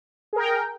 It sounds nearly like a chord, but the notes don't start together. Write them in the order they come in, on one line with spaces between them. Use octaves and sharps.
G#4 A#4 G5